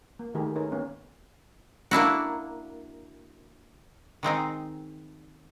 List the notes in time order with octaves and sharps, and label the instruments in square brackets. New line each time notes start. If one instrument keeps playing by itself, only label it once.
[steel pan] A#3
D#3 A3 G4 G#4 A#4
D#4 G#4 A#4 B4 C#5
A#3 B3 C#4 D#4
[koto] A#3 D4 E4 F#4
D#3 G#3 C4 D#4